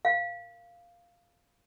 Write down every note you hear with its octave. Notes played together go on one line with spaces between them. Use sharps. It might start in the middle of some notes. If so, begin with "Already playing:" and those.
F5